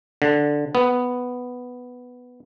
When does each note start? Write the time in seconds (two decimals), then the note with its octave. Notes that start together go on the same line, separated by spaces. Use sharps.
0.22 D3
0.75 B3